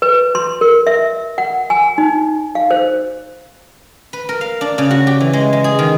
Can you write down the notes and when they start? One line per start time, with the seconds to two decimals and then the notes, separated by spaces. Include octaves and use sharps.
0.02 B4
0.35 C6
0.61 A#4
0.87 E5
1.38 F#5
1.70 G#5
1.98 D#4
2.55 F5
2.71 C5
4.13 B4
4.29 A#4
4.41 F5
4.61 D4
4.78 C#3
4.91 F#4
5.07 G4
5.21 E3
5.33 G#3
5.53 G#3
5.64 G#4
5.79 D#3